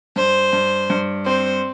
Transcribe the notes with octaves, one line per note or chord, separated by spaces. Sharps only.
G2 C5
G2
G2
C4 C5